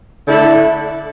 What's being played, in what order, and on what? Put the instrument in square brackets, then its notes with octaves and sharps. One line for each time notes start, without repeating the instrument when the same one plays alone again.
[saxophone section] D3 A3 E4 A4